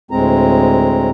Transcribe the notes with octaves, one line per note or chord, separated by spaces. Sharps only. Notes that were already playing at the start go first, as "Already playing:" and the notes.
D2 A2 G#3 C4 A#5